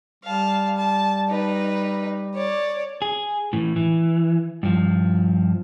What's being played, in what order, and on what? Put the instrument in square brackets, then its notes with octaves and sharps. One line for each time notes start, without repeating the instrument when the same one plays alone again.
[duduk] G3 [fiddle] F5 A5
[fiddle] A5
D#4 B4
C#5 D5
[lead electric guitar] G#4
A2 E3
E3
G2 F3